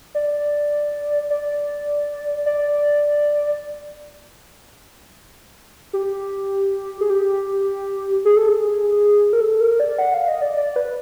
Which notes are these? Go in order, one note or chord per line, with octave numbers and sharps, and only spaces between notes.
D5
D5
D5
G4
G#4
G4
G#4
A4
G#4
A#4
A4
A#4
D5
F#5
F5
D#5
D5
D5
B4